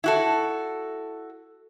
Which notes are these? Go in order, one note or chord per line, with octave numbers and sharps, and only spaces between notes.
E4 F#4 A4